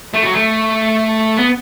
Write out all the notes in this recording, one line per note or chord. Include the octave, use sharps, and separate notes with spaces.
A3
F#3
A3
B3